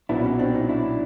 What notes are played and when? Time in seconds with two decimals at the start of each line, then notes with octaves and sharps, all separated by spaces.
0.09 B1 A#2 F#3 B3 D4 E4
0.24 C#4 D#4
0.39 C4 D4
0.54 C#4 D#4
0.69 D4 E4